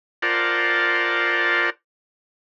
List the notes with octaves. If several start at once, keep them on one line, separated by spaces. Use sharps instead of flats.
F4 A#4 C5 D5 F#5 A5